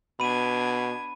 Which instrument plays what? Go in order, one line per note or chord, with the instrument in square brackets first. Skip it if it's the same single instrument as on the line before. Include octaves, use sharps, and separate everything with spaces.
[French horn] B2 [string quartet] B3 D4 G#6 [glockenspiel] B5 D#7